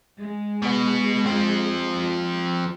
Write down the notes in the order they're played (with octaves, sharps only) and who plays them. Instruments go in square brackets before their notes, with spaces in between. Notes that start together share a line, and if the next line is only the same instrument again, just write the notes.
[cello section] G#3
[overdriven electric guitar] B2 B3
F3 C4